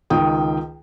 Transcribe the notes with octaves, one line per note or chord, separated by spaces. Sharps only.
C#2 D#3 G5 D#6